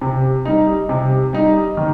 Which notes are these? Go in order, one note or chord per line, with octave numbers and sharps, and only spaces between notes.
C3
G3 D#4
C3
G3 D#4
D#3